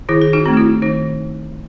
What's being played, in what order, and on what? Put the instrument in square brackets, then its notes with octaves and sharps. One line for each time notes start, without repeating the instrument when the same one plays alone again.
[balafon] D#3 E4 G#4
G#4
D#4 F#4
A3 C4
F#4
E4
D#3 D#4